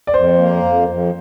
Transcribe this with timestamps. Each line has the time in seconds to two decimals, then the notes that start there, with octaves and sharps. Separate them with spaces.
0.07 D5
0.14 F2 C5
0.38 A#3
0.63 F2
0.89 F2